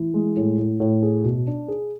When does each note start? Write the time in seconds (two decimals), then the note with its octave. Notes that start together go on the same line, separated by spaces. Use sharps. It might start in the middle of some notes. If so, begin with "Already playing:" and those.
Already playing: E3
0.14 G#3
0.36 A2
0.58 A2
0.80 A2
1.03 G#4
1.24 B2
1.47 D4
1.68 G#4